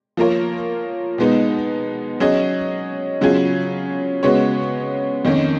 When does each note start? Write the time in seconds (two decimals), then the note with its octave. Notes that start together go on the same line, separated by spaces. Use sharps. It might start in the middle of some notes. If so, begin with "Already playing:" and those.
0.17 F3 A#3 F4 A#4 C#5
1.18 B2 G#3 B3 D#4
2.20 F#3 C#4 G#4 D#5
3.21 C#3 F#3 C#4 F4 G#4
4.23 C#3 G#3 B3 F#4 C#5
5.25 F2 D#3 A#3 C#4